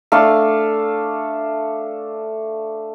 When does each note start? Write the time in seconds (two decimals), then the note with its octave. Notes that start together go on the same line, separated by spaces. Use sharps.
0.12 A3 D4 A4 F5